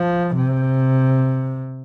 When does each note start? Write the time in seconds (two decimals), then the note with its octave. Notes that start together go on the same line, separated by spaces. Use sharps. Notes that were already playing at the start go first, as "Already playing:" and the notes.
Already playing: F3
0.35 C3